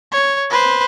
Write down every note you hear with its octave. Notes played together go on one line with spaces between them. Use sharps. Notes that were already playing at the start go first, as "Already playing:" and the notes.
C#5
B4 C5